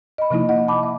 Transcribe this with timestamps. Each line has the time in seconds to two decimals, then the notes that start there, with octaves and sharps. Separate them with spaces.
0.18 D#5 B5
0.30 C3 F3 A#3 D#4 E4
0.49 D#5 F#5
0.68 A5 B5 D6
0.83 E5